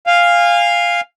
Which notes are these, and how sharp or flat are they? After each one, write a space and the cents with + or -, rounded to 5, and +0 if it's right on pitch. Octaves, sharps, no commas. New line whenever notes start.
F5 +0 G#5 -30